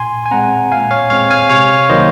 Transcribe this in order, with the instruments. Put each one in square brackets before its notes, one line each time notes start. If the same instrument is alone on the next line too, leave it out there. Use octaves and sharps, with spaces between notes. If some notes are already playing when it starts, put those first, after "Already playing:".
Already playing: [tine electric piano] A#2 G#5 C6
G#5
G#3 C4 F#5 A#5
A#2 F5 G#5
C#5 F5
G#3 C4 C#5 F5
F5 G#5
C3 C#5 F5
D#3 F#3 A#3 C5 D#5